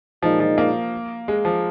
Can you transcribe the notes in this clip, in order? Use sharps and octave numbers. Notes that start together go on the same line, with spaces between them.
A#2 F3 G#3 D#4
F3
A#3
G#3
F3